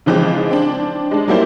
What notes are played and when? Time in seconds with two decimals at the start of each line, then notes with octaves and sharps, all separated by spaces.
0.06 C#3 E3 F3 G#3 C4
0.51 C4 D4
1.11 G#3 D4
1.28 F#3 G3 A#3 E4 C5 D5